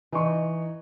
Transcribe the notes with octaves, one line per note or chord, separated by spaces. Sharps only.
E3 D#4 C#6